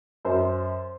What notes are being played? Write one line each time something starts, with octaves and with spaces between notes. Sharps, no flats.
F#2 C5